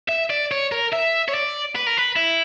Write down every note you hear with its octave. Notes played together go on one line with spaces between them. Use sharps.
E5
D5
C#5
A#4
E5
C#5
D5
B4
A#4
B4
E4